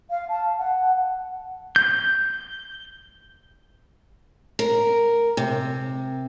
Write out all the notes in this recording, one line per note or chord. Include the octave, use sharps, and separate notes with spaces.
F5
A5
F#5
G6
A#4
C3